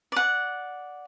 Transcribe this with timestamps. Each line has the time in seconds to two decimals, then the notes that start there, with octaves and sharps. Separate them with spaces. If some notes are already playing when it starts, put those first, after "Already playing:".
0.12 D5 F#5